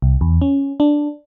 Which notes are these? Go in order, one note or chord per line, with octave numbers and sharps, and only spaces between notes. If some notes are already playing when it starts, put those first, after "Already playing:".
C2
E2
C#4
D4